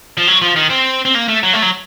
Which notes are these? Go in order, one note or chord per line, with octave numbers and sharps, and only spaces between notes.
F3
F#3
F3
D#3
C4
C4
A#3
A3
F#3
A3
F#3